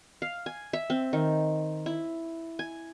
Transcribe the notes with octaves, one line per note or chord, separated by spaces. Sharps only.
F5
G#5
E5
C4
D#3
E4
G#5